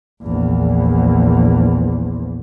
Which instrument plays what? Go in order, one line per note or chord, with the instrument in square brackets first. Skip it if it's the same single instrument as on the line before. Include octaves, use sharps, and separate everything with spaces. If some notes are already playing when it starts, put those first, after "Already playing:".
[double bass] A#1 E2